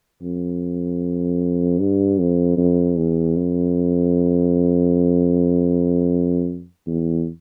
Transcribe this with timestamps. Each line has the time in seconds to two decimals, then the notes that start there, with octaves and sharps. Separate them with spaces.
0.22 F2
1.79 G2
2.19 F2
2.57 F2
2.97 E2
3.36 F2
6.87 E2